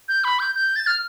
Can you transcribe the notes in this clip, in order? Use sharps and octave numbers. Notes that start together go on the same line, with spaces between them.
G6
B5
G6
G6
A6
F6